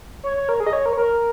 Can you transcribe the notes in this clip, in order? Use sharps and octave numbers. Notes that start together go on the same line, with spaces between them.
C#5
C#5
A#4
G#4
D#5
C#5
A#4
C#5
A#4